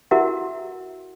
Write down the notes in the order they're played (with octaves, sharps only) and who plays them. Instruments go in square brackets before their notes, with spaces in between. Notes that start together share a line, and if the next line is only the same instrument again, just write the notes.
[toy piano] E4 F#4 A#4 E5 F#5